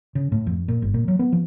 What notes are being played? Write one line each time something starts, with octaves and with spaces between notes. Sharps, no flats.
C#3
A2
F2
A#2
G1
A#2
F#3
B3
F3